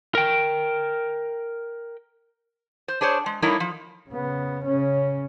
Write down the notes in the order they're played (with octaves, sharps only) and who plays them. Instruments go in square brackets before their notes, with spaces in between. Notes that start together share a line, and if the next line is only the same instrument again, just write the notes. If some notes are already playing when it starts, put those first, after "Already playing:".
[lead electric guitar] A#4 G5
[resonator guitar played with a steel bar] C5
D4 G#4 C5 C#5
G#3
G3 A3 A#3 D#4 E4 C#5
F3
[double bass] C#3 B3
C#3 C#4